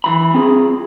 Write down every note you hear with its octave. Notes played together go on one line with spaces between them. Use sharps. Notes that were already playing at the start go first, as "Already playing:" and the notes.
E3 B5
C4 F4 G#4